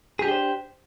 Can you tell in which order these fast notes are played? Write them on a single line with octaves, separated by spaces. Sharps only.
G#4 G4 D4 G5 C5